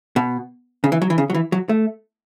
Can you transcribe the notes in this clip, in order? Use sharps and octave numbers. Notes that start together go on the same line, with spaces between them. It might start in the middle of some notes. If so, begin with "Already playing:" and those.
B2
C#3
E3
F#3
E3
C#3
F#3
E3
F#3
A3